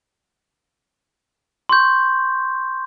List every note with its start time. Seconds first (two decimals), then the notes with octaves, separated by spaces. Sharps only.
1.69 C6 C#6 G6